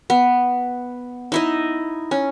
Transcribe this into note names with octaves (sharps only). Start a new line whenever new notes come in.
B3
D#4 E4 D#5
C#4